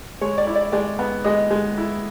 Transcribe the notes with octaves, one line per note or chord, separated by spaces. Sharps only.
G#3 C#5
D5
E4
D5
G#3 D5
B3
G#3 D#5
G#3
E4